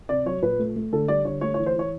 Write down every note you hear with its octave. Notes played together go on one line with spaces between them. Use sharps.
C3 D5
F#3 C#5
A#2 B4
A3
A3
D3 A4
G3 D5
D3 C#5
A3 C#5
C#5
E3
C5
E3 C#5